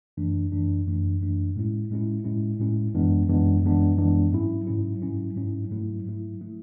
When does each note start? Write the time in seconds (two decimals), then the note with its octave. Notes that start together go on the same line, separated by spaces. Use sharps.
0.17 F#2 E3 A3 D4
0.52 F#2 E3 A3 D4
0.87 F#2 E3 A3 D4
1.21 F#2 E3 A3 D4
1.56 A2 G#3 C#4 E4
1.90 A2 G#3 C#4 E4
2.24 A2 G#3 C#4 E4
2.60 A2 G#3 C#4 E4
2.94 F#2 E3 G#3 B3 D4
3.29 F#2 E3 G#3 B3 D4
3.63 F#2 E3 G#3 B3 D4
3.98 F#2 E3 G#3 B3 D4
4.32 G#2 F#3 C#4 E4
4.67 G#2 F#3 C#4 E4
5.02 G#2 F#3 C#4 E4
5.36 G#2 F#3 C#4 E4
5.71 G#2 F#3 A3 E4
6.06 G#2 F#3 A3 E4
6.41 F#3 A3 E4